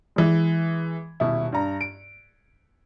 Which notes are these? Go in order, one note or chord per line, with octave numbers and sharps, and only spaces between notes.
E3 G#3
D#1 B2 E4
G2 A#5
D7